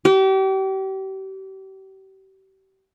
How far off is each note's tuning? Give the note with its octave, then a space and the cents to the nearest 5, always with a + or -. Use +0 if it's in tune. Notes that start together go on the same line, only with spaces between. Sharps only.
G4 -35